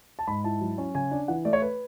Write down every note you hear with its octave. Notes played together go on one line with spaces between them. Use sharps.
A5
G#2 B5
E4 A5
F#3
C#4
C#3 G#5
D4
E3 F#5
A3 D5
C#5
B4